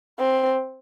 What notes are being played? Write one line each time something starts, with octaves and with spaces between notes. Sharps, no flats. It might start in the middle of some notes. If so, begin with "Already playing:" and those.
C4